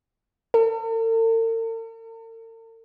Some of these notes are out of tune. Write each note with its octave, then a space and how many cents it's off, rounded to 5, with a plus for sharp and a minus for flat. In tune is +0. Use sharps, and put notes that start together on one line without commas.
A4 +45